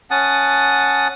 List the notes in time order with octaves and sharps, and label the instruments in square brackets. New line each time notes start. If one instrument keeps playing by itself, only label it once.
[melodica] C#4 F#5 A5 D#6